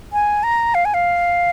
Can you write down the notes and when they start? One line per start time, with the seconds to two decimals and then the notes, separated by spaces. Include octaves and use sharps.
0.13 G#5
0.43 A#5
0.75 F5
0.85 G#5
0.94 F5